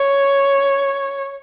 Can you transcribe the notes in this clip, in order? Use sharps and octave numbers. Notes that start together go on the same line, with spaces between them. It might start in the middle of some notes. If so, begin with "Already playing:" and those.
Already playing: C#5